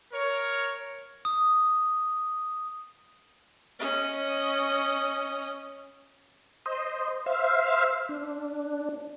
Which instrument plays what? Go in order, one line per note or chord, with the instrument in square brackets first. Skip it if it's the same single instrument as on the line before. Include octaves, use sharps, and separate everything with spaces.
[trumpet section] A#4 C#5
[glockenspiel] D#6
[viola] C#4 D#5
[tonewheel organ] C5 D#5
C5 E5 F5
D4